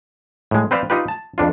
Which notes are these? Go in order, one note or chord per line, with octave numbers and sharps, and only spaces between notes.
A2 G#3
C4 B4 C5 D5 F5
D#4 F4 G4 B4
A5
F2 D4 F4